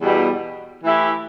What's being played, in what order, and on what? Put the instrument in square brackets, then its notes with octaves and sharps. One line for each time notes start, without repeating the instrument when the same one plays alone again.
[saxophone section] E2 B2 G3
E3 A3 E4 G4